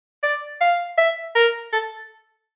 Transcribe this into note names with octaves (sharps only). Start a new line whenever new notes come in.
D5
F5
E5
A#4
A4